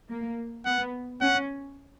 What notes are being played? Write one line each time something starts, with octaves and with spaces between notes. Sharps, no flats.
A#3
B3 F#5
C#4 F#5